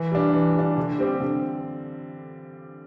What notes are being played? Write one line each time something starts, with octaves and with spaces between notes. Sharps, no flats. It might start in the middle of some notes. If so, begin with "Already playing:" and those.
Already playing: E3
G3 D4
E3
G3 D4
D3
G3 C4 G4
D3